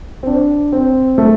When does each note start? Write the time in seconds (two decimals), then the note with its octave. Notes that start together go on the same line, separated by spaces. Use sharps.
0.23 C4
0.27 D4
0.72 C4
1.18 A3